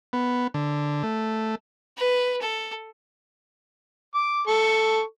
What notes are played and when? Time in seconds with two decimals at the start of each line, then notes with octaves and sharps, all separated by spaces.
0.13 B3
0.54 D3
1.03 A3
1.98 B4
2.42 A4
4.15 D6
4.48 A4 C#6